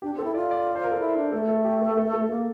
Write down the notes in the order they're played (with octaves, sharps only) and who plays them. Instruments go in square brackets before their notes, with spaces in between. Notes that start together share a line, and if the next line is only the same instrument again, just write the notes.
[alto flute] D4 [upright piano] G4
[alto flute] C4
[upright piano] A4
[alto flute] E4
[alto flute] F4 [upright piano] D5
[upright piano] D5
D5
C5
A#4
A4
[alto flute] E4
D4
[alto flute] A3 [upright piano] A4
[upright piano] A4
G4
A4
A4
A4
[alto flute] A#3 [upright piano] A4